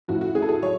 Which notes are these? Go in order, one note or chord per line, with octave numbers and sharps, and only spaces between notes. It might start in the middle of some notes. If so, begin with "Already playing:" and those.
A2 F3 F#4
F#4
G#4
A4
G#4
F#3 C#5